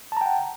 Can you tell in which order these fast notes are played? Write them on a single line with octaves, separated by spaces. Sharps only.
A5 A#5 G5 F#5